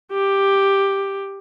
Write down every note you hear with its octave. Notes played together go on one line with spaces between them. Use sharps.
G4